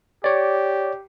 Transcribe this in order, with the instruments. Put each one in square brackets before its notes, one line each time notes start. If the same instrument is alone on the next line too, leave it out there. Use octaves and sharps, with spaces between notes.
[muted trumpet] G4 [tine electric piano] C#5 D5